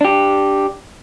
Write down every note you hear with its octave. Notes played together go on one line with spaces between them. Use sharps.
D4 G4